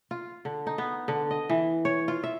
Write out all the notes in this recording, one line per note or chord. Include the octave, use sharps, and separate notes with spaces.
F4
D3
D#4
B3
D3
D#5
E3
C#5
F4
E5